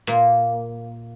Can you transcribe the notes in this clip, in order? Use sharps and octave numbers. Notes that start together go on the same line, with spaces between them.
A#2 A#3